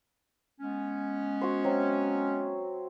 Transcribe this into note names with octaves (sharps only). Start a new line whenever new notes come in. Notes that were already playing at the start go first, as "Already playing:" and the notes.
G#3 B3 C#4
F#4 C5
F#3 C4 E5